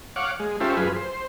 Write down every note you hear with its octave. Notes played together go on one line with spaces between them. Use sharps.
C#5 F5 F#5 D6
G#3
C#4 F4 G4 A4 C5 E5
F#2 F4 G#4 B4
C5